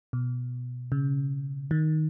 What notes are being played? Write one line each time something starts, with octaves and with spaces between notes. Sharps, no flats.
B2
C#3
D#3